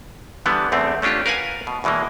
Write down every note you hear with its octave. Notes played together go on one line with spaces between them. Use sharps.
D3 E3 G3 B3
E2 D3 A3 C4
A3 C#4 D4 F4 G4
A#4 B4 F5 F#5 G#5
B2
E2 B2 E3 G#3 A#3